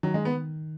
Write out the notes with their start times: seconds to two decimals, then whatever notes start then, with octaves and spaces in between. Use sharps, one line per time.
0.03 D#3 F#3
0.14 G#3
0.25 B3